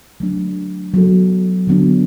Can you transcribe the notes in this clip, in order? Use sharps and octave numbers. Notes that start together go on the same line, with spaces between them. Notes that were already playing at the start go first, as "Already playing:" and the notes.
F#3 A3 D4
F#3 B3 F#4 A4
D3 F#3 B3 D4